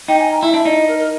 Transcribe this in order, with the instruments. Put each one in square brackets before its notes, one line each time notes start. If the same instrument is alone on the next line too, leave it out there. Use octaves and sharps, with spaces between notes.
[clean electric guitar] D#4 [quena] G5
[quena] G#5
A#5
[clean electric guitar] E4 [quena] E5
[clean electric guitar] D4 [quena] E5
[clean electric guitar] D#4 [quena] D5
[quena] D#5
A#4
A#4